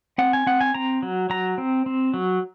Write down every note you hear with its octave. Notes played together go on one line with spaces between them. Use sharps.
C4 F#5
G#5
C4 F#5
G#5
C4 A#5
F#3
F#3 A#5
C4
C4
F#3